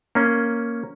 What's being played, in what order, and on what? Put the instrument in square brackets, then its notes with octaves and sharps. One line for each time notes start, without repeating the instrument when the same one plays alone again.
[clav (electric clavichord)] A#3 C#4